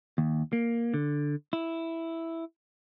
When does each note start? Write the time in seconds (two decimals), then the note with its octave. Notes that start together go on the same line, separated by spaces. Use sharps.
0.18 D#2
0.53 A#3
0.94 D3
1.53 E4